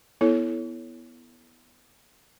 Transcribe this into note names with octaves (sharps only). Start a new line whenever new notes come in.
B3 E4 A4 C#5